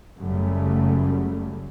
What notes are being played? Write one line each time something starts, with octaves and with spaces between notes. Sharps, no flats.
F#1 F#2 C#3 F#3 G3 A3